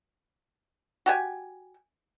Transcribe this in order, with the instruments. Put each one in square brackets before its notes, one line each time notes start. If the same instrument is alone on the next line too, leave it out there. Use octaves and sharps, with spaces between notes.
[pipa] F#4 G4 G#5